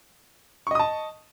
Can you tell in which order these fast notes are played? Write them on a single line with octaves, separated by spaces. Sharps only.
C#6 D#5 D#6 A5